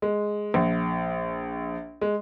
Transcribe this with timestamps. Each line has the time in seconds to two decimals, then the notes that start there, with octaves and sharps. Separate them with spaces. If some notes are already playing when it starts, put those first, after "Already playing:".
0.02 G#3
0.54 A#1
2.01 G#3